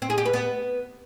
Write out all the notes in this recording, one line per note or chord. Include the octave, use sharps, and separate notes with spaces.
C4
G#4
G4
B4
B3